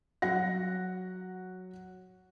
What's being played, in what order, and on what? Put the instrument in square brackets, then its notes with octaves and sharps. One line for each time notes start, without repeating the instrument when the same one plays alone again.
[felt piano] F#3 F#5 A#6